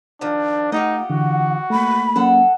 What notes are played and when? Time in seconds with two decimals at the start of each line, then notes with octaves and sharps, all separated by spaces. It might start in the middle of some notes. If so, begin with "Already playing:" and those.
0.21 D#3 F3 D4
0.72 A3 D#4 F4 G4 D#5 F#5
1.10 D3 E3 F#4
1.70 A3 A#3 B5
2.16 F#3 A#3 C#4 A4 F#5